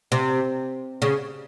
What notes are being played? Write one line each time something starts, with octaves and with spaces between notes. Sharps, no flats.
C3
C#3